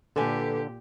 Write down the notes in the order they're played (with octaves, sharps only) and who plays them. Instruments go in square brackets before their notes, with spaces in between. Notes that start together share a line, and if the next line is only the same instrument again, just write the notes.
[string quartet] A#2 G4 [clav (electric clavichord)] D3 [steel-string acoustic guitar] A4 B4 G#5